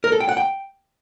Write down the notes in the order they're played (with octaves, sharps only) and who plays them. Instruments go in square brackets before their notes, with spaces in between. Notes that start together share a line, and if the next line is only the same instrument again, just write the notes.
[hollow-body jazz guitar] A#4
A4
G5
F#5
G5